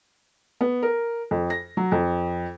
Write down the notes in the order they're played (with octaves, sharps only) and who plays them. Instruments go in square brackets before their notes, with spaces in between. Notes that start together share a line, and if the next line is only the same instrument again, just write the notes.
[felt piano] B3
A#4
F2
A#6
F#3
F2